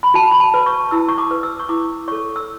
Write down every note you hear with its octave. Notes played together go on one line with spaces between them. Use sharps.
B5
F#4 A5
B5
A5
B4
C#6
E4 E6
C#6
D6
B4
E6
C#6
E4 D6
A4 C#5 C#6
E6